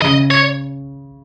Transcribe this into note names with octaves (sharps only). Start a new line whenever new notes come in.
C#3 D#5
C#5